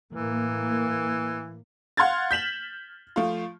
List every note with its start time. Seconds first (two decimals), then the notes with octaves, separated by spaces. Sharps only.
0.13 A2 E3 A#3
1.97 F5 F#5 C6 F6 G#6 A6
2.31 G6 B6 E7 F#7
3.16 F3 A3 F4